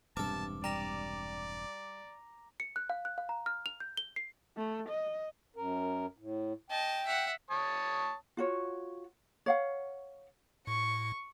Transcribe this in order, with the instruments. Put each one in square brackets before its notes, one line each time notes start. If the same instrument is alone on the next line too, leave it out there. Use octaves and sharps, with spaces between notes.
[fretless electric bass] E1 G2 C3 [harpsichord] A4 A#4 [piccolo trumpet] A5 [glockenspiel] D6
[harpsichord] G3 [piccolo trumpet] D5 [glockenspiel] A#5 A#6 F7
[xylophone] C#7
F#6
F5
F#6
F5
A#5
F6
F7
G6
G7
C7
[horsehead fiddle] A3
D#5
[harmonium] F#2 A#4
A2
[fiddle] D#5 A5 [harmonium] G5
[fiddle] E5 F#5
[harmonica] C#5 A5 D#6
[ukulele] F4 F#4 C#5
C#5 F5 F#5
[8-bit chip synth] A2 [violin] C#6